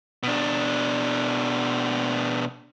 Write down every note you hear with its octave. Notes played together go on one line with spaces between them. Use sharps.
B2 D4